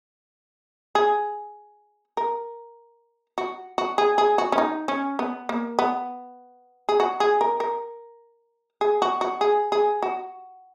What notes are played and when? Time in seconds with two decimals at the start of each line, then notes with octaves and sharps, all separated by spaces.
0.95 G#4
2.17 A#4
3.38 F#4
3.78 F#4
3.98 G#4
4.18 G#4
4.38 F#4
4.52 C#4
4.58 D#4
4.88 C#4
5.19 B3
5.49 A#3
5.79 B3
6.89 G#4
7.00 F#4
7.20 G#4
7.41 A#4
7.60 A#4
8.81 G#4
9.02 F#4
9.21 F#4
9.41 G#4
9.72 G#4
10.03 F#4